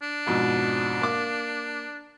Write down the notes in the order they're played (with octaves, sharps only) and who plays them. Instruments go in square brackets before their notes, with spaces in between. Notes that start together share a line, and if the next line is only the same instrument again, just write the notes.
[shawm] D4
[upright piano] F2 G#2 B2
A#3 D6